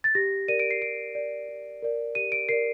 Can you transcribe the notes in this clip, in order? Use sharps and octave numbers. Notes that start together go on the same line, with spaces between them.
A6
G4 A#6
A#4 D5 D#7
D7
C7
G4 D7
A#4 D5
G4
A#4 D5
G4 D#7
D7
A#4 D5 C7